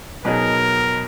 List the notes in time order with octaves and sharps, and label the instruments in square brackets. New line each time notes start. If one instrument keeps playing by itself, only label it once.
[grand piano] B2 F#3 B3 D#4 G#4 [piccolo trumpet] A#4